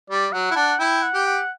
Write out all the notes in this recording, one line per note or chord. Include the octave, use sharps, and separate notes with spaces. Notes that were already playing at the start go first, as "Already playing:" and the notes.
G3 D5
F#3 F#5
E4
D4 F#5
E4 G5
F#5
G4
F#5